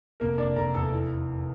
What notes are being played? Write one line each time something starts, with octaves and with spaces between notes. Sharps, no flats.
F1 A#3 A#4
F1 D4 D5
F1 A#4 A#5
E2 A4 A5
E3